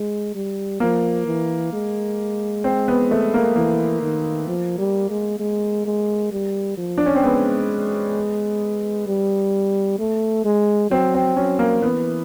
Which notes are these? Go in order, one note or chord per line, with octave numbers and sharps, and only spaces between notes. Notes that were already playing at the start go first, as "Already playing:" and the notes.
Already playing: G#3
G3
F3 A#3
E3
G#3
C4
B3
A3
A#3
E3 A#3
D#3
F3
G3
G#3
G#3
G#3
G3
F3
D4
C#4
C4
G#3 B3
G3
A3
G#3
F#3 C4
C4
F#3 C#4
A#3
E3 B3